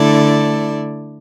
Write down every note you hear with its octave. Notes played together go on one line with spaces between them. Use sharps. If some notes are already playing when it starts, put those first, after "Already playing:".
Already playing: D3 A3 E4 A4 D5